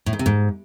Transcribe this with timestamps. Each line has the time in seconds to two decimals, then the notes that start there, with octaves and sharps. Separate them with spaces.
0.06 A2
0.13 G#2
0.19 C3
0.26 G#2